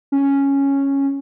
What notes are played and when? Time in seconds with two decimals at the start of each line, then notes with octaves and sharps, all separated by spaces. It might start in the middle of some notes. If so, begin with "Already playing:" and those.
0.12 C#4